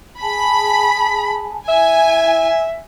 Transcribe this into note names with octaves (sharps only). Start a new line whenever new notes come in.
G#4 G#5 A5 B5
E4 E5 G#5